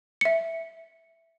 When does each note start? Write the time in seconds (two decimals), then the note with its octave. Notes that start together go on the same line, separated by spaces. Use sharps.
0.21 E5 C#7